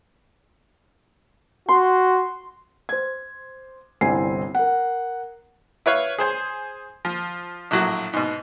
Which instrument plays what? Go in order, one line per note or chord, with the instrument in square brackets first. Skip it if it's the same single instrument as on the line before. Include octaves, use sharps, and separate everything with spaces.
[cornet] F#4 [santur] C6
[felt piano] C5 G#6
G1 C2 C4 E4 G#5 C7
A#4 F#5
[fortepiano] E4 B4 C#5 F5
G#4 C5 G#5
F3
A#1 A2 F#3 F#4
G#2 B2